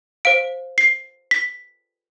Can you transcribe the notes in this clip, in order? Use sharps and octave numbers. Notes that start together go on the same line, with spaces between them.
C5 F5 D7
C7
B6